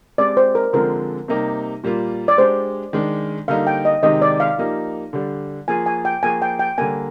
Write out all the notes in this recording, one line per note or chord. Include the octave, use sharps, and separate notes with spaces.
G#3 C4 G4 D5
C5
A#4
D3 F3 G#3 C4 A#4
C3 G3 A#3 D#4 G4
A#2 G3 A#3 F4
D5
G#3 D4 G4 C5
D#3 G#3 D4
D3 G3 A#3 D#4 F5
G5
D#5
C3 D#3 G#3 D#4 G4 D#5
D5
F5
F3 A#3 D#4 G4
D3 G3 D4
F3 A#3 F4 G#4 G#5
G#5
G5
F3 A#3 F4 G#4 G#5
G5
G5
D3 G3 A#3 G#5